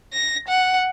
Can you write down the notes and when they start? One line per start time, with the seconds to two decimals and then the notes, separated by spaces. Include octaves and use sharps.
0.13 A#6
0.48 F#5